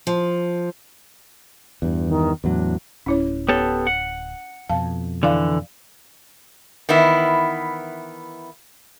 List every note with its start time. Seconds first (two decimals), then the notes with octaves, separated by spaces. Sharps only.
0.07 F3
1.82 E2 G2
2.08 D#3
2.44 E2 A2 F#3 D4
3.06 D1 C#4 E4 C#5
3.49 B3 G4 A4 C#5 A5
3.87 F#5
4.69 F2 B2 F5 A5
5.23 D3 E3 D5 F5
6.89 D#3 E3 B3 E4